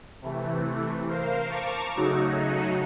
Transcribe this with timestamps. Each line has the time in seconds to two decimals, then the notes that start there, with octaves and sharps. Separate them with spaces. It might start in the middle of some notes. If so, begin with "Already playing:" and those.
0.22 C3 E3 A3
1.07 A#4 C5 F5
1.49 A5 A#5 C#6 D6
1.96 C#3 F#3 A3 D#4 F#4